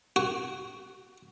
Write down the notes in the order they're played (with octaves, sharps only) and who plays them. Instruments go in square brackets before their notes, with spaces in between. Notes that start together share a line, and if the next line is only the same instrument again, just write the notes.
[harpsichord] F#4